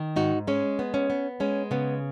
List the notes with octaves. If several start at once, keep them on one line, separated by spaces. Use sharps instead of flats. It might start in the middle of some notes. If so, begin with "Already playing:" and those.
Already playing: D#3
G#2 D#4 F#4
G#3 C#4
B3
C#4
B3
G#3 C#4
C#3 B3